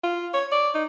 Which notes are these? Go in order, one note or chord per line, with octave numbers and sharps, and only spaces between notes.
F4
C#5
D5
D#4